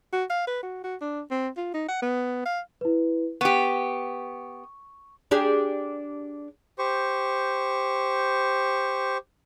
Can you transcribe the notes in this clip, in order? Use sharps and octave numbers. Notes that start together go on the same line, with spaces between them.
F#4
F5
B4
F#4
F#4
D4
C4
F4
D#4
F#5
B3
F5
E4 B4
B3 G4 C#6
D4 G4 G#4
G4 C5 C#6